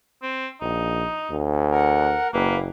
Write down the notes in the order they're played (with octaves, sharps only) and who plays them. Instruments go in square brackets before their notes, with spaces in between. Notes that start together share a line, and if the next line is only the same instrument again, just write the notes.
[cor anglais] C4
[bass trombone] A#1 [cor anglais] D#4
[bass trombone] D2
[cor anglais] A#4 [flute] F#5
[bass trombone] F#1 [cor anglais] A#3 [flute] B4